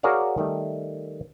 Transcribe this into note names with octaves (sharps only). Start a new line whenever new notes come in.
F#4 G#4 A#4 C#5 D5 F5
D#3 G3 A3